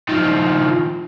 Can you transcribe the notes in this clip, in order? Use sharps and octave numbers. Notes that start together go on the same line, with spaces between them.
D#3 F3